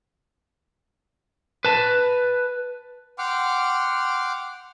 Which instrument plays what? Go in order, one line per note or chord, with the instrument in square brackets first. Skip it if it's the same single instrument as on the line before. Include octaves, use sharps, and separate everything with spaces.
[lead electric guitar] B4 A5
[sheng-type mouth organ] F#5 G5 C6 D6 F6